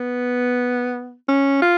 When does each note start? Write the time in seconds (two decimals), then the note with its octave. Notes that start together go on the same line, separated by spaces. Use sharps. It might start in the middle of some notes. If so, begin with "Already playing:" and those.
Already playing: B3
1.29 C#4
1.62 F4